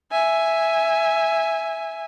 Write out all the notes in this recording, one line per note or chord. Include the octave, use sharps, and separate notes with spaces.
E5 G#5